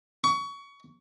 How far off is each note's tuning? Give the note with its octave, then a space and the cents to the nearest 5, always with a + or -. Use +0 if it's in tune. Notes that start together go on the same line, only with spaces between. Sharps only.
C#6 +25